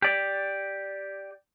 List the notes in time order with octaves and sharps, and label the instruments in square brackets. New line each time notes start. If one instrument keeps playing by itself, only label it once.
[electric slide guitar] G4 D5